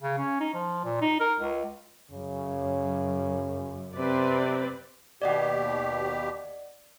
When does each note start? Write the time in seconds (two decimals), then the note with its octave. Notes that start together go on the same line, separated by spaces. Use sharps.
0.02 C#3
0.18 C#4
0.40 D#4
0.54 F3
0.84 A#2
1.01 D#4
1.20 A#4
1.40 C#2
2.11 F#2 C#3
3.96 C3 C4 B4 D5
5.22 D#2 B2 G4 D5 D#5 F#5